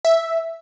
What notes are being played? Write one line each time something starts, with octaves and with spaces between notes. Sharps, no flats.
E5